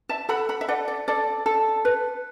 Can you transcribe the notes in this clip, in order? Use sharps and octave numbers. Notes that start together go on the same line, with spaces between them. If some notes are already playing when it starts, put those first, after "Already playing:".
E5 A5
A4 F#5 B5
F#5 B5
E5
A4 D5 F#5
D5
A4 D5
A4
B4